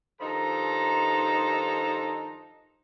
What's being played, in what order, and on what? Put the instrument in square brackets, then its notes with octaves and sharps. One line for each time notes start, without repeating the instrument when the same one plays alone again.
[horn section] G2 D#3 F3 D#4 A4 A#5